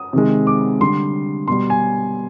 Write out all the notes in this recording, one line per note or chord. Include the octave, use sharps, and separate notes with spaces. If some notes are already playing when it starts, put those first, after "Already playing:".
Already playing: D#6
C3 D#3 G#3
D6
D3 G3 C6
B2 G3 C6
G#5